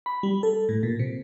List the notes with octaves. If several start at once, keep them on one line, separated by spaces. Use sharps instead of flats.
B5
G3
A4
A2
A#2
C3